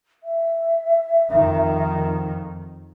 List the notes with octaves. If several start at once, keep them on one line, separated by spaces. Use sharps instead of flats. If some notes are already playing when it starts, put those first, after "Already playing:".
E5
F2 D#3